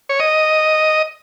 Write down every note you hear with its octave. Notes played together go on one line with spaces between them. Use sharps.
C#5
D#5